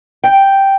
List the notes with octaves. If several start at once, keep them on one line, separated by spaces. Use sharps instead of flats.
G5